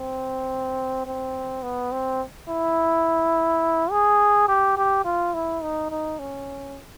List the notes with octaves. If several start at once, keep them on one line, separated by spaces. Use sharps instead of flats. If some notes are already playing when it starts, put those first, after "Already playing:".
Already playing: C4
C4
B3
C4
E4
G#4
G4
G4
F4
E4
D#4
D#4
C#4